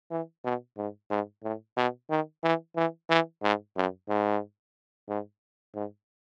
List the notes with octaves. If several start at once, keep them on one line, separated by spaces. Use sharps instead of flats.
E3
B2
G#2
G#2
A2
B2
D#3
E3
E3
E3
G#2
F#2
G#2
G#2
G#2